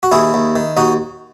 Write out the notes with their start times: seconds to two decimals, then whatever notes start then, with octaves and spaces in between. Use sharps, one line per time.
0.03 F#4
0.12 D#2 E4 G#4
0.34 D#2
0.56 D#3
0.77 D#2 D#4 F#4